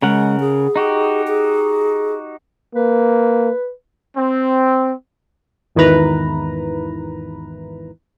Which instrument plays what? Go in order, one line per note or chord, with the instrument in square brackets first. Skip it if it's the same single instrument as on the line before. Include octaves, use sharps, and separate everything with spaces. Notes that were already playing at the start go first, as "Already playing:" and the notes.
[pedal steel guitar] C#3 A#4 F#5 [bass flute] G#3
[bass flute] G#4
[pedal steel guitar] D#4 F#4 G4
[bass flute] G#4
[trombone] A#3 [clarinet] B4
[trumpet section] C4
[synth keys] G#1 E2 D#3 E4 B4 A#5